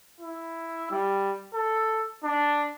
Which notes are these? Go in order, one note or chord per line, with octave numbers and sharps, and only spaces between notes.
E4
G3
A4
D4